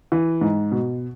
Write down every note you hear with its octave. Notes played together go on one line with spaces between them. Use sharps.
E3
G#2
B2